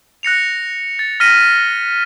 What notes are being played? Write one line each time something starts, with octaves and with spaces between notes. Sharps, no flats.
F#6 A#6 C#7 F7
A6
F6 A#6 B6 D#7